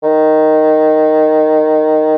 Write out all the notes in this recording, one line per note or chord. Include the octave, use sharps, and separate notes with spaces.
D#3